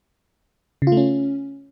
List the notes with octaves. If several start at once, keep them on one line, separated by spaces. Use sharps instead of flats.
C#3
F4
A3
C#4